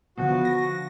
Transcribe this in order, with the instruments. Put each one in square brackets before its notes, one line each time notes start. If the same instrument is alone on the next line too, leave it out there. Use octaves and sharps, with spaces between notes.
[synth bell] D3 F3 B3 [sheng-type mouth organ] F#4
[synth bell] A#6